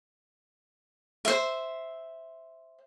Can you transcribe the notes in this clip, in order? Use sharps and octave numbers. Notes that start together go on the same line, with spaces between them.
C5 E5